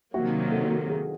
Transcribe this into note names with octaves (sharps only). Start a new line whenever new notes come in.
C3 D#3 F#3 A#3 F#4
A4
G#4